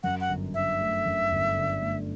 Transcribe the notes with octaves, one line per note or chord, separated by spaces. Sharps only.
F#2 F#5
F#5
G1
D3 E5
A3
F#2
G1
D3
A3